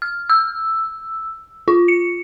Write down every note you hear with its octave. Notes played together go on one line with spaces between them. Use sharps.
F6
E6
F4
C#7